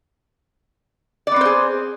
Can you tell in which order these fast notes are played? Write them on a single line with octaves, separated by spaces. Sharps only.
D5 B3 C4 C5 G#4